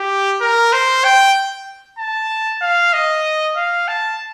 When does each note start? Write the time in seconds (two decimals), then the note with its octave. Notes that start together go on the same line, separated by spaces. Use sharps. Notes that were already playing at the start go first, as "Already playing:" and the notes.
Already playing: G4
0.41 A#4
0.73 C5
1.04 G5
1.99 A5
2.62 F5
2.93 D#5
3.57 F5
3.88 A5